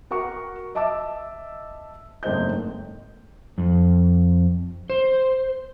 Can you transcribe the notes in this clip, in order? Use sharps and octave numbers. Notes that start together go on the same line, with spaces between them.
F#4 A#4 F#5 C#6
D#5 E5 A5 D6 E6
F#1 G#2 A3 C4 D#5 G6
F2
C5